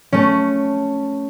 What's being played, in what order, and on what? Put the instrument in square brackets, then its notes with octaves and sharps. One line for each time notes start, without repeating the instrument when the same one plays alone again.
[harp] A3 C#4